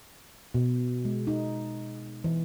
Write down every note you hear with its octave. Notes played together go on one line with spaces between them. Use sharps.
B2
G#3
D#4
E3